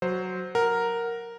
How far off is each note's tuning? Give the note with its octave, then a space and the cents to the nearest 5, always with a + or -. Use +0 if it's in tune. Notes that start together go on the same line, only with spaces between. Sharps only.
F#3 +0 C5 +0
A#4 +0 F#5 +0